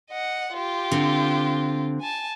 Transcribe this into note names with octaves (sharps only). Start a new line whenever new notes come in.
D#5 F#5
F4 G4
D3 C4
G#5 A5